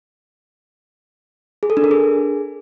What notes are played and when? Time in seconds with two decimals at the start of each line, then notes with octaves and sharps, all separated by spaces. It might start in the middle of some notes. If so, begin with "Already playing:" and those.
1.63 G#4
1.70 A4
1.77 D4
1.84 A#4
1.91 G#4